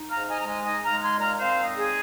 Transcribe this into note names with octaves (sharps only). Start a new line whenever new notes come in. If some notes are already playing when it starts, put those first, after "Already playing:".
Already playing: D#4
F5 A#5
G#2
D#5 G#5
G#3 A#5
D#5 G#5
D#4 D#5 G#5
F5 A#5
G#3
G#5 C6
A#2
F5 A#5
C4 C5 F5
D#4
G#4